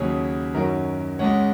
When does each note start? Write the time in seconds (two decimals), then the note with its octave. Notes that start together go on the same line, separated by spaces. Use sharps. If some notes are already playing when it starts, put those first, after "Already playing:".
Already playing: D#2 C#3 F#3 G#4 C#5
0.54 F#2 D#3 F#3 C#4 F#4 A#4
1.19 C#2 C#3 G#3 C#5 F#5